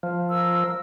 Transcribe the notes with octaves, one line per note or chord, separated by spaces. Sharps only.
F3
F4 A#4 E6